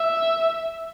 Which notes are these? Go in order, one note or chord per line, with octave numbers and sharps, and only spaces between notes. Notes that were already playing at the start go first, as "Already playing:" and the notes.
Already playing: E5